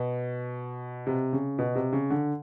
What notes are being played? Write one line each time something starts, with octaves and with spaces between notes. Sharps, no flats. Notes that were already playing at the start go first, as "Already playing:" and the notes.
Already playing: B2
C3
C#3
B2
C3
C#3
D3